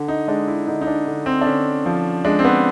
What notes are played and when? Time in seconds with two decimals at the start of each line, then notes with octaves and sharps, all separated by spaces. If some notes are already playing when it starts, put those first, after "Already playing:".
Already playing: D3
0.08 D#4
0.28 G#3 D4
0.47 E4
0.67 D3 D#4
0.81 D#4
0.87 D4
1.07 D3
1.26 C4
1.41 D4
1.46 D3 C#4
1.86 F3
2.25 G#3 D4
2.39 C4
2.45 B3